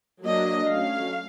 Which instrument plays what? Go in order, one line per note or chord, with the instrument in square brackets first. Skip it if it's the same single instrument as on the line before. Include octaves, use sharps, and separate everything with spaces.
[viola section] F#3 A#3 D4 D#5
F#3 A3 C#4 F5